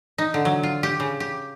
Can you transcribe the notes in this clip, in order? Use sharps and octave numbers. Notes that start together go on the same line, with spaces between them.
D#4
D3
F#3
F4
G4
C#3
G4